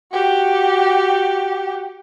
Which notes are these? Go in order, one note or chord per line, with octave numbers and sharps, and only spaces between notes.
F#4 G4